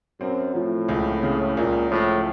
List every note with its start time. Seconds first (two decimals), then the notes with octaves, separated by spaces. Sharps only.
0.20 F#2 C4
0.54 A2 F3
0.89 C#2
1.23 C#3
1.57 C#2 A#2
1.90 A2 F3